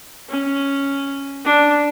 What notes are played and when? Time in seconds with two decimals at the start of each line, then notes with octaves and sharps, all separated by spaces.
0.29 C#4
1.45 D4